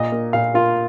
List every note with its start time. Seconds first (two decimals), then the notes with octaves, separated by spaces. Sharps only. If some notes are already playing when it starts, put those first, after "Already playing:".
Already playing: A#2 D#5
0.12 A#3
0.33 A#2 F5
0.54 A#3 F4